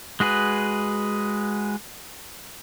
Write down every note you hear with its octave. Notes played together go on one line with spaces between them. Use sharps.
G#3 F#4 G#4 B4